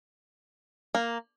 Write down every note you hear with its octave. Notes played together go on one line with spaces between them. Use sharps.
A#3